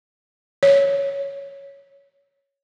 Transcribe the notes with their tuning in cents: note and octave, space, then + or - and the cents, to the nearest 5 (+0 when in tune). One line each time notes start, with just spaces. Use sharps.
C#5 +5